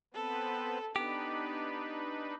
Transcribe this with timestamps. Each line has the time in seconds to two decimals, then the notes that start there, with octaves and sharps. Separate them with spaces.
0.14 B3 C4 A4 B4
0.96 B3 D4 D#4 G4 B4